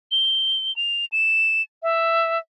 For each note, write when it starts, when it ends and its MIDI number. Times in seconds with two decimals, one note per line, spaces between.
0.11 0.74 103
0.76 1.05 101
1.12 1.62 100
1.83 2.38 76